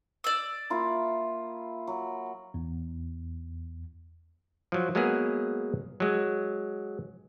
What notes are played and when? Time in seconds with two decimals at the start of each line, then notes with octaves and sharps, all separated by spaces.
0.24 D5 E6
0.70 A#3 E4 F4
1.87 F#3
2.54 E2
4.72 F3 F#3
4.95 F#3 G#3 A#3 B3 G#4
6.00 F#3 G#3